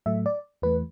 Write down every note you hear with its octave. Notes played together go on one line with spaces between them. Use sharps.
A2 F#3 A3 E5
D5
E2 E3 A3 B4